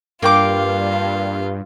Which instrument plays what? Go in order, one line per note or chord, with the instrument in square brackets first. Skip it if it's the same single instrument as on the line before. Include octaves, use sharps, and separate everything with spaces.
[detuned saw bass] G2 [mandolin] A#3 G5 D6 [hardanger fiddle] F4